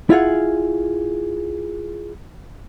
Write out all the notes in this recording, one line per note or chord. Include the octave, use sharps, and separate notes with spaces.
E4 F4 G#4 F#5